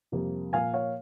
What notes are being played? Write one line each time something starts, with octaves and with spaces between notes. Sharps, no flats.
F2 C3 G3 A#3
A#2 F3 A#3 F5 G#5
C#5 F5